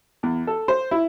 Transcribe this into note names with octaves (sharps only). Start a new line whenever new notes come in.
E2
A4
C5
E4